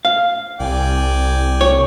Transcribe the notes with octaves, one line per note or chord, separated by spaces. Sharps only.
F5
C2 D5 G5 G#5
C#5